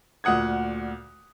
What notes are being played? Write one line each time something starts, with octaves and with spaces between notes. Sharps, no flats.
D2 A#2 F#5 D#6 G#6